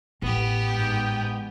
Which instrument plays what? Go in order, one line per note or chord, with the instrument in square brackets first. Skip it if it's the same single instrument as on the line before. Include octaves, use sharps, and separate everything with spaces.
[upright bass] A1 [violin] B3 G4
[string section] G#2 G5